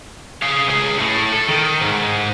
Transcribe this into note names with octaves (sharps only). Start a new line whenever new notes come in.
G#4 F5
C#2 G#4
A2 A3
A4
D#3
G#2